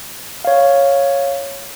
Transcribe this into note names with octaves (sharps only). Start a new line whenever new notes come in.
C#5 F5